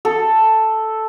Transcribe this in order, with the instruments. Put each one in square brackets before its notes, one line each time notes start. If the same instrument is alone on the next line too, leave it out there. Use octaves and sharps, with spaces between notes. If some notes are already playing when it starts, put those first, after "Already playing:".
[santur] A4